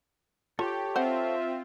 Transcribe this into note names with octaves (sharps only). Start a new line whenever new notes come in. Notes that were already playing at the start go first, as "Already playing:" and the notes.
F4 G4 A4 C#5 G5
C4 F4 C5 E5 F#5